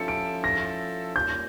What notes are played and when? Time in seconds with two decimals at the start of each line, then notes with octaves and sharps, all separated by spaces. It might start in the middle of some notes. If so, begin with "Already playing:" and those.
Already playing: F3 C#4 E4 A4 C#7
0.08 D7
0.44 A#6
1.15 G3 A#3 C#4 F4 G6